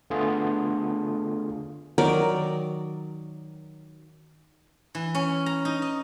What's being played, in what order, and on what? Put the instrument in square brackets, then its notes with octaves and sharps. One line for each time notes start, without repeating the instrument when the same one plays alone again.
[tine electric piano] D3 A3 B3 F4 G#4
[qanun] D#3 F#3 A#4 D5
[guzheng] E3
C#4
A#5
D#4
D#5